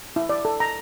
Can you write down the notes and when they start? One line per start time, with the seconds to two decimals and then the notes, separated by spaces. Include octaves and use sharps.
0.16 E4
0.29 D5
0.45 A4
0.60 A#5